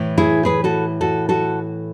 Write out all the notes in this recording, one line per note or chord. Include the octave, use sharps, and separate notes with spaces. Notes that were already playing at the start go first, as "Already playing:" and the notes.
Already playing: A2 E3
E4 G#4
G#4 B4
F#4 A4
F#4 A4
F#4 A4